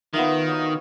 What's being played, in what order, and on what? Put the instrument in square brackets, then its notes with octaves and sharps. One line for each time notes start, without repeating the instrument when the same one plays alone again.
[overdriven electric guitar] D#3 [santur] B3 F4 E5
[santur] F#4 C#5 D#5